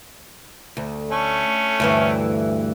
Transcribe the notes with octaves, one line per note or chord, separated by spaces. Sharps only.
D2
A3 C#4
D2 G2 E3